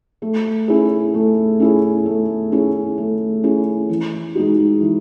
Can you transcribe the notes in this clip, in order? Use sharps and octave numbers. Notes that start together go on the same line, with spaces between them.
A3
C#4 E4 G#4
A3
C#4 E4 G#4
A3
C#4 E4 G#4
A3
C#4 E4 G#4
E3
G#3 D#4 F#4
E3